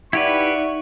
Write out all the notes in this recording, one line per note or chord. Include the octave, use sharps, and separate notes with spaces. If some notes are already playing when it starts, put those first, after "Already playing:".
D#4 E4 G4 B4 D5 E5 F#5 C#6